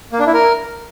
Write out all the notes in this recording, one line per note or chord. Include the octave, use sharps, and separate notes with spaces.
A#3
D4
E4
A#4